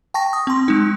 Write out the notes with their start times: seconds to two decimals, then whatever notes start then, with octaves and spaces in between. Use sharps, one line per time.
0.14 G5 A5 C#6 A#6
0.33 D#6
0.47 C4 C6
0.68 G#3 D#4